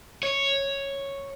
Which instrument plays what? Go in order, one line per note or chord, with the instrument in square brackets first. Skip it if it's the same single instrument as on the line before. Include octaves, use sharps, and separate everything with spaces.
[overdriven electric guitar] C#5